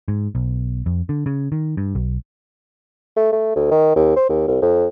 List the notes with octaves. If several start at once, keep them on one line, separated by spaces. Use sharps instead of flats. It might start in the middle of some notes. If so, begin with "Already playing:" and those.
G#2
B1
F2
D3
C#3
D#3
G2
B1
A3
A3
D2
D#3
D#2
C5
D#2
C2
F2